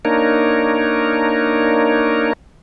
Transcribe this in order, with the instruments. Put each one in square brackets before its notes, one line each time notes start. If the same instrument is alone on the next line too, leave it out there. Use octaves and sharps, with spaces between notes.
[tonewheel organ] A#3 D4 D#4 A#4 C#5